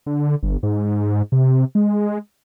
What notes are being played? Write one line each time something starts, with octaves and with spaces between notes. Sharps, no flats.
D3
G1
G#2
C3
G#3